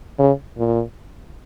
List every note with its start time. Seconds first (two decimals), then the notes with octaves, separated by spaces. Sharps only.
0.19 C#3
0.58 A#2